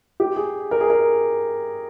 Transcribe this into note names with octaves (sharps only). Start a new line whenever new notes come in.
G4
G#4
A#4
G#4
A#4